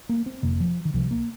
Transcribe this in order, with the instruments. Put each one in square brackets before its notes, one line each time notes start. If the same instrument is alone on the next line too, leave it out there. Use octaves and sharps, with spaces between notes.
[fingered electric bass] A#3
C4
F1 F2 C3 A#3
F3
D#3
C2 C3 F3
A#3